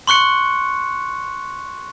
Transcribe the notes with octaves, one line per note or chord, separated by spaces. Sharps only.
C6 C#6 F#6 C#7